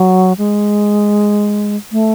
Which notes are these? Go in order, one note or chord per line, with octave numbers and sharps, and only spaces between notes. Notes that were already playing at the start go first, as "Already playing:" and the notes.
Already playing: F#3
G#3
A3